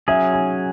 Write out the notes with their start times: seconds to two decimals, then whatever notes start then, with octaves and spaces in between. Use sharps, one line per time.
0.08 F#3 C#4 G#4 E5
0.33 G#5